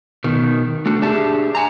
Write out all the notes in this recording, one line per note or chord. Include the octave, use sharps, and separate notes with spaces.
B2 D#3
A3 D4 F#4
D4 G4 G#4 D5 E5 A5
F#5 G#5 A#5